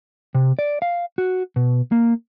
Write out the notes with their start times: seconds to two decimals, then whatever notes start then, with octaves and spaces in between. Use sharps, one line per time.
0.35 C3
0.59 D5
0.82 F5
1.18 F#4
1.56 B2
1.92 A#3